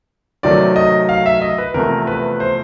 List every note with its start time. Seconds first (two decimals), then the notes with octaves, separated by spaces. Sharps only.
0.43 C3 D#3 F#3 A3 D5
0.76 D#5
1.09 F5
1.26 E5
1.42 D#5
1.58 B4
1.74 E2 C3 F3 A3 A#4
2.07 B4
2.40 C5